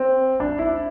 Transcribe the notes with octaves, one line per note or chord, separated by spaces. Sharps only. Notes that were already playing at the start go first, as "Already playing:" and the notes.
Already playing: C4
D4
E4